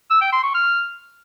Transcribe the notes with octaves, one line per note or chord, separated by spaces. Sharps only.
E6
G5
C6
C#6
F6